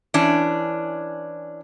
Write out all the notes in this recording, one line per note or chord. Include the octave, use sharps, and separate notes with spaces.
E3 C#4 D4